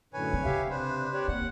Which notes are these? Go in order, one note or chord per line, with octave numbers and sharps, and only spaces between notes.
F#2 A2 D3 B4 C#5 G#5
D3 C4
C#3 G4 E5 F5
C3 D4 B4 C5
G4 C#5 D5
D#2 C4 F#5